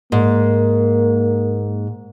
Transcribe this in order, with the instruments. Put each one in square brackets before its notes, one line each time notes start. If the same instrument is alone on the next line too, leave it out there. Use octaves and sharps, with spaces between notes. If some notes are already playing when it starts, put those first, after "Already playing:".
[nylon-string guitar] G#2 [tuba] A#3